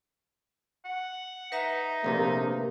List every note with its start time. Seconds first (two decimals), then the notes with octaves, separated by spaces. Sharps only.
0.85 F#5
1.52 D#4 B4 E5 A#5
2.04 A#1 C3 A3 A#3